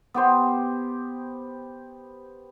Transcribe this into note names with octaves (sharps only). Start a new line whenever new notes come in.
B3 G4 C5